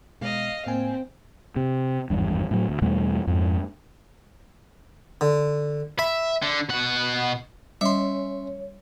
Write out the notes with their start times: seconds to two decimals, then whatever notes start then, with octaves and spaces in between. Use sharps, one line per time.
0.21 B2 G#3 B3 D#5 F5
0.66 A2 A#3 C4 G#5
1.56 C3
2.10 G#1 E2 G2
2.51 A2 F#3
2.69 D2
2.82 E2 B2 G3 A3
3.27 F2 G#2
5.21 D3
5.99 E5 B5
6.42 D3
6.69 B2 F#5
7.81 G3 C#4 C#5 E5 C6